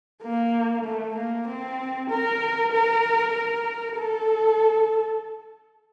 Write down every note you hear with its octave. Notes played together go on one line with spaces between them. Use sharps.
A#3
A3
A#3
C4
A#4
A#4
A#4
A4